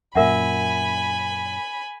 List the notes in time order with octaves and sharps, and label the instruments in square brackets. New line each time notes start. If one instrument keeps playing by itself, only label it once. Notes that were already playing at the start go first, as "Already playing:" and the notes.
[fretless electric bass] F#2 A#2 [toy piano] A#4 E5 F#5 [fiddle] G#5 B5